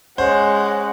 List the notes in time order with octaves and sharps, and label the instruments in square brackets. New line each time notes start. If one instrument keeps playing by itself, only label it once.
[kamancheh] G#3 F#5 [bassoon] C#4 [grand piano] C5